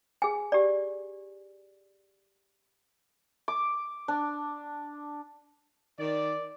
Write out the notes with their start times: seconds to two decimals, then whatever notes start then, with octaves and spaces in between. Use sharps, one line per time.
0.22 G#4 G#5
0.52 G4 D5
3.48 D6
4.08 D4
6.00 D#3 D5